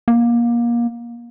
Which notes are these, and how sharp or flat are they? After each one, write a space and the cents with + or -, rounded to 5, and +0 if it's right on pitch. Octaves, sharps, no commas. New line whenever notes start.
A#3 +25